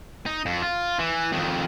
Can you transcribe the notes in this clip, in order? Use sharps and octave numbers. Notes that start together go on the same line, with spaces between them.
D#4
F2
F4
E3
F2 D#3